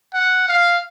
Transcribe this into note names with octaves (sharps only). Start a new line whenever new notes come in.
F#5
F5